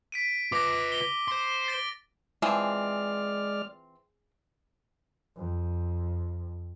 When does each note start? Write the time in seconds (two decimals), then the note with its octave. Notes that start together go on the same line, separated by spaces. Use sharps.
0.12 B6 D7 D#7
0.52 F4 B4 D6 A#6
0.92 B6 G7
1.28 C5 C6
1.68 A6 D7 G7
2.42 E3 F3 G#3 C4 G#4 D5 F6
5.37 F2